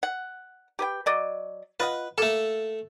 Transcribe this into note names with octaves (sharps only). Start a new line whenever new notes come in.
F#5
G4 B4 G5
F#3 D5 D#5
F4 B4 D#5 F#5
A3 A#3 A4